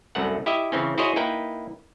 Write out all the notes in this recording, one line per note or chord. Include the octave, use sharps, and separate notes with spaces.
C2 F#2 A3 F#5
E4 G4 D#5 E5
C#3 E3 C4 C#4
E4 F#4 G#4 C5 C#5 D#5
A#3 D#4 E4 B4 G5